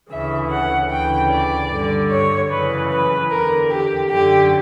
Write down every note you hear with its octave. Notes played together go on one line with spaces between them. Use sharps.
D2 C#3 E3 E5
F#5
D2 C#3 E3 G5
D5
G2 D3
C#5
F#2 C#3 E3 B4
B4
E2 D3 A#4
G4
F#2 D3 G4